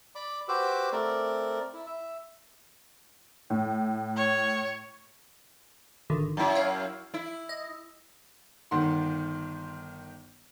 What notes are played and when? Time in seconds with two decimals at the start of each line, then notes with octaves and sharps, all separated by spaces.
0.15 D5 B5 D6
0.48 F#4 G4 B4 C5 D6 E6
0.92 A3 C4 A#4 D5
1.73 E4
1.86 E5
3.50 A2
4.17 C#5
6.10 G#1 D3 D#3
6.37 F#2 E4
6.55 C#5 F5
7.14 E4
7.49 D#5
8.71 G1 D#3 F#5 C6